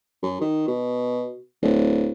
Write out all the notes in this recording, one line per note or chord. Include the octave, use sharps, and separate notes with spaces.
F#2
D#3
B2
D1